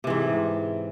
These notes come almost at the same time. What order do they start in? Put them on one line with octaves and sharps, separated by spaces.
C3 E3 G#2